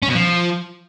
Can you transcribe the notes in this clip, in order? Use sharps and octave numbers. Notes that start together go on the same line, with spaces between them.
C#4
B2
F3